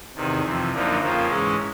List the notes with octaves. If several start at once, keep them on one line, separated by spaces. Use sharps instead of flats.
E2 C3 D#3
F2 C3 E3
F#2 D3 F3 A#3 D#4
F2 C#3 F3 A#3
G#2 E3 G#3 C#4